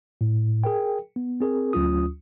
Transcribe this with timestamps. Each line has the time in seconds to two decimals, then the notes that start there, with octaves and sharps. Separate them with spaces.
0.21 A2
0.64 G#4 A#4 G5
1.16 B3
1.41 C4 G#4 A#4
1.73 D2 F#3 C#4 F4 D#6